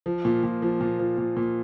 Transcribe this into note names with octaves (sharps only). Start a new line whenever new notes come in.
F3
A#2
A#2
F3
A#2
F3
A#2
A#2